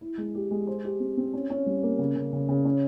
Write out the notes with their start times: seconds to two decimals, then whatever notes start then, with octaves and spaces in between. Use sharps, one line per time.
0.01 E4
0.18 G#3
0.35 G4
0.51 G#3
0.67 C5
0.84 G4
1.00 C4
1.17 C4
1.33 C#4
1.50 C#4
1.66 G3
1.83 A#3
1.99 C#3
2.16 C#3
2.33 C#3
2.49 C#3
2.65 C#4